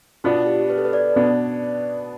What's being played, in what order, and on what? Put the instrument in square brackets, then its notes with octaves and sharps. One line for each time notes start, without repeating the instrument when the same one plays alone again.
[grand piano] B2 B3 D4 [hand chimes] F4
[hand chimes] G4
B4
A4
B4
D5
[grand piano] B2 B3 D4